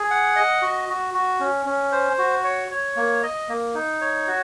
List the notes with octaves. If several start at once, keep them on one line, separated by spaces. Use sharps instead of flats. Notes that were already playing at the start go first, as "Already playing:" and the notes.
Already playing: G#4
F#5
D#5
F#4
F#4
F#4
C#4
C#4
C5
F#4
C#5
C#5
A#3
D#5
A#3
D#4
C#5
F#4